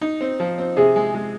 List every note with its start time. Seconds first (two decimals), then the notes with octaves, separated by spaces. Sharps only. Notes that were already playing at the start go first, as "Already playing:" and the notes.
0.01 D#4
0.21 C4
0.40 F3
0.58 C4
0.77 C3 G#4
0.96 G#3
1.15 G#3